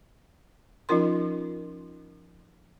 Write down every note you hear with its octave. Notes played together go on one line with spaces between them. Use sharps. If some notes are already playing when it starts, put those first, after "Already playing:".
F3 C#4 D#4 F4 A#4 C6